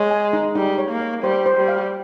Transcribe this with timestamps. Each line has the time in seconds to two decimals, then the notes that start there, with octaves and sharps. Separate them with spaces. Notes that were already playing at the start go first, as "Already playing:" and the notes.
Already playing: G#3 C#5
0.11 G#5
0.33 D#4
0.55 G3 D#4
0.78 C#5
0.90 A#3
1.01 C#5
1.23 G3 C5
1.46 C5
1.57 G3
1.68 F5